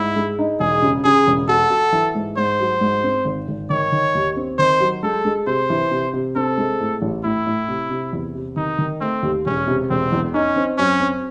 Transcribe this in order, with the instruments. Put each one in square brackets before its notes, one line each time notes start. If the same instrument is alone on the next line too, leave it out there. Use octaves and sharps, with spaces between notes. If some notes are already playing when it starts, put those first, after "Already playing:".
Already playing: [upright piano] G#2 [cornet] E4
[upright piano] G#3
D#4
[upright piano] E1 [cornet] G#4
[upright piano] C#3
[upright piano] C#3 [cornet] G#4
[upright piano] E1
[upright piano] F#4 [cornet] A4
[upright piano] F#4
E3
G#2
[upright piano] G#2 [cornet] C5
[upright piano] F#3
G#2
C4
G#1
G#1
[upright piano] D#3 [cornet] C#5
[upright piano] D#3
D#2
C4
[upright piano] D#3 [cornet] C5
[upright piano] F#3
[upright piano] G#3 [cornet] A4
[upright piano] G#3
[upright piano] C3 [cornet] C5
[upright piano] E3
C3
C3
[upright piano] C4 [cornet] A4
[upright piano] G#3
A2
A1
[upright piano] A2 [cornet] E4
[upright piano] A2
C3
C3
E2
C3
[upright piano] D#3 [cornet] D#4
[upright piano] D#3
[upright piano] A3 [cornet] C4
[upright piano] D#2
[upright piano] E1 [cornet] C#4
[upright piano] C3
[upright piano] E1 [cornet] C4
[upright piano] E2
[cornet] C#4 [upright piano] D#4
[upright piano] C4
[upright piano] F#2 [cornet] C#4
[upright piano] C4